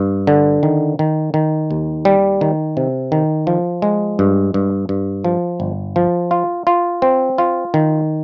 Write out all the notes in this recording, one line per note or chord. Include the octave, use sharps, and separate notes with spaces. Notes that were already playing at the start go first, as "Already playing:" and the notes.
Already playing: G2
D3
D#3
D#3
D#3
D#2
G3
D#3
C3
D#3
F3
G#3
G2
G2
G2
F3
G1
F3
F4
F4
C4
F4
D#3